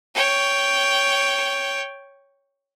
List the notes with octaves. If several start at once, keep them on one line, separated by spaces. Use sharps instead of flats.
C#5 G5